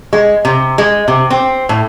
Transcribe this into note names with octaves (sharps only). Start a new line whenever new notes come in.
G#3
C3
G#3
C3
C4
A2